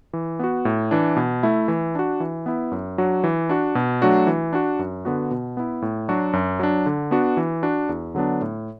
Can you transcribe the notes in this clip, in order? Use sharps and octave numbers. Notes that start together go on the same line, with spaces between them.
E3
B3 F#4
A2
E3 D4
B2
A3 E4
E3
D4 F#4
E3
B3 E4
F#2
F#3 D4 F#4
E3
D4 F#4
B2
F#3 A3 D4 F#4
E3
D4 F#4
F#2
D3 B3 F#4
B2
B3 E4
A2
F#3 D4 F#4
F#2
F#3 D4
D3
B3 D4 F#4
E3
D4 F#4
E2
D3 F#3 B3 D4
A2